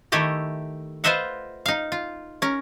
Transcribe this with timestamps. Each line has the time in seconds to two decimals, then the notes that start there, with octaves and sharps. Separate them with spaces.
0.12 D#3 A3 E4 G4 D#5
1.04 F4 B4 C5 D#5 E5 F#5
1.66 D#4 F5
1.92 F4
2.42 C#4 A#4